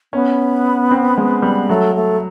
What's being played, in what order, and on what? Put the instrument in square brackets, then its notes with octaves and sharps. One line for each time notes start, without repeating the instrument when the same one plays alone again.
[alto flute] B3 [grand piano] C#4
[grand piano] C4
G#3
G3
[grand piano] F#3 [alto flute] A3
[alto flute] A3